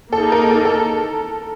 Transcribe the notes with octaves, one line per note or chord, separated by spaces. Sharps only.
A#3 D#4 G#4 A4
A#4
A4
A4